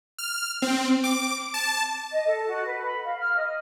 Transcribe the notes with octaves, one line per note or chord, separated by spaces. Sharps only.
F6
C4
D6
A5
D#5
A4
F#4
B4
B5
F5
F6
D#5